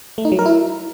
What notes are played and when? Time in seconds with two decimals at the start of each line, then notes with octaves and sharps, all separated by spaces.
0.18 A3
0.25 D#4
0.32 F#3
0.39 A#4
0.46 E4